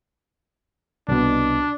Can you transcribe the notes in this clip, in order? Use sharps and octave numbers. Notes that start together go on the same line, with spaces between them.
C2 B2 D4